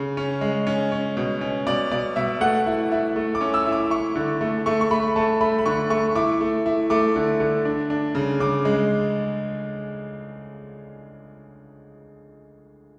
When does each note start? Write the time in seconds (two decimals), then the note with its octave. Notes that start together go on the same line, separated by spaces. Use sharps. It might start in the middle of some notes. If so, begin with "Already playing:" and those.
Already playing: C#3
0.17 C#4
0.41 G#3
0.67 C#4
0.92 C#4
1.17 B2
1.41 C#4
1.67 B2 D5
1.91 B2 D5
2.16 B2 E5
2.41 A3 F#5
2.66 E4
2.92 E4
3.16 A3
3.35 D6
3.41 C#4
3.54 E6
3.66 E4
3.72 D6
3.90 E4 C#6
4.15 D3
4.41 A3
4.66 A3 C#6
4.81 C#6
4.91 A3 B5
5.16 A3 A5
5.41 A3 B5
5.59 B5
5.66 D3 C#6
5.90 A3 C#6
6.15 E4 D6
6.41 A3
6.66 E4
6.90 A3 D6
7.16 D3
7.40 D3
7.65 D4
7.90 D4
8.15 C#3
8.40 C#3 D6
8.65 G#3